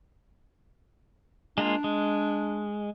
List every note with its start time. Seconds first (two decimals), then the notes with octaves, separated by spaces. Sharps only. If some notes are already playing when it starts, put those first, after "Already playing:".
1.58 G#3 A#3 D4 F4
1.84 G#3